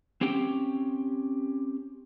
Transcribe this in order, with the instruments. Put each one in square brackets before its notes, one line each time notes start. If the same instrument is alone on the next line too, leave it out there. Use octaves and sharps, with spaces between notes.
[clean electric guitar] C4 C#4 G4 G5